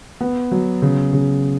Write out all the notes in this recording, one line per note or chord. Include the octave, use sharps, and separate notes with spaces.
B3
F#3
C#3
C#3